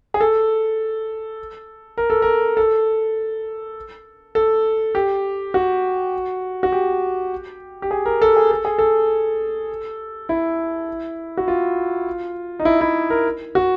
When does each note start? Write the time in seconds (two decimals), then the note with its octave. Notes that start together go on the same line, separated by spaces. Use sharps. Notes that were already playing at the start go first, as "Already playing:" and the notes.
0.14 G#4
0.21 A4
1.98 A#4
2.10 A4
2.22 A#4
2.57 A4
4.35 A4
4.95 G4
5.54 F#4
6.63 F#4
6.72 G4
7.82 G4
7.91 G#4
8.06 A#4
8.22 A4
8.36 G#4
8.51 A4
8.65 G#4
8.79 A4
10.29 E4
11.37 F#4
11.48 F4
12.59 D#4
12.65 E4
12.81 E4
13.10 A#4
13.55 F#4